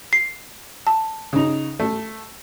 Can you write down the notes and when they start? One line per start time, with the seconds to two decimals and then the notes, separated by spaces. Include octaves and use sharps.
0.13 C7
0.87 A5
1.33 C#3 D#4
1.80 A3